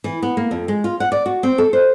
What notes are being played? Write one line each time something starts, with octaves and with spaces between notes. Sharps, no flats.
E3
B3
A#3
F2
G#3
F4
F#5
D5
F#4
C4
A4
C5